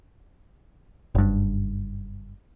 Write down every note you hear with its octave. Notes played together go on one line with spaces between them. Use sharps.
F#1 G2